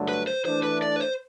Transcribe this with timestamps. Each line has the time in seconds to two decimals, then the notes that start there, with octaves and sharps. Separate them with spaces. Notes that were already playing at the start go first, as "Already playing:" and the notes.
Already playing: G2 D3 F#3 A3
0.09 B4
0.27 C5
0.45 E3 A3 D4 C5
0.64 B4
0.82 D5
0.96 B4
1.00 C5